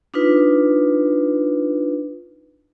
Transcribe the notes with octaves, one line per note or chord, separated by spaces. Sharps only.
D4 D#4 F4 B4